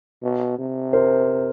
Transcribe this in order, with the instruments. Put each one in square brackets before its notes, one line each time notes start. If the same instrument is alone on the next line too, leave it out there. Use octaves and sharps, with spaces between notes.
[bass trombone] B2
C3
[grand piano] A#4 C5